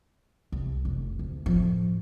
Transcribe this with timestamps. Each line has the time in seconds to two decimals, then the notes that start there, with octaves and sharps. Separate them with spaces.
0.52 C2
0.85 F1
1.19 D2
1.46 A2 F3